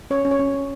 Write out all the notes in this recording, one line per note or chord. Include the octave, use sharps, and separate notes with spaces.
C#4 C#5
C#4
C#5
C#4
C#4